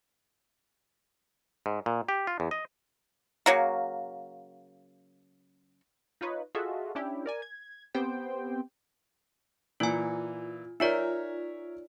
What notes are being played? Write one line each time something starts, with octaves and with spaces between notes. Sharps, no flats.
G#2
A#2
G4
F4
E2
D#5
C#3 F#3 A#3
D#4 F4 B4 C#5 D#5
F4 F#4 G#4 A4 D#5 E5
C#4 D4 E4 G4
A#4 D5 G#5
G#6
B3 C4 G4 C5 G5
A#2 E3 F4 G#5
D#4 F4 A#4 C#5 D5 E5